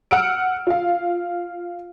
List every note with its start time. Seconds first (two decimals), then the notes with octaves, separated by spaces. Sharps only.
0.11 F#5 E6 F6 D7
0.67 F4 F5